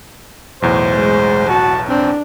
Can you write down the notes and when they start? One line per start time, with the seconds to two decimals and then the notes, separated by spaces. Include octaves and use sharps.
0.62 B1 E2 A2 C5
0.95 G#3
1.50 F#4 A5
1.89 C4 D4